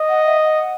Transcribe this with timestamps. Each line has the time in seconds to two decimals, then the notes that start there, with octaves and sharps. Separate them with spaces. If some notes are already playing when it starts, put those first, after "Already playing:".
Already playing: D#5
0.09 F#5
0.26 E5
0.43 F#5